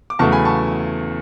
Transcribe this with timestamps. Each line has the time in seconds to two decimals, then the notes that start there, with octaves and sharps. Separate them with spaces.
0.10 D6
0.19 E2 C#3 F#3 A3 A5 C#6
0.32 G#5 B5
0.45 A5 C#6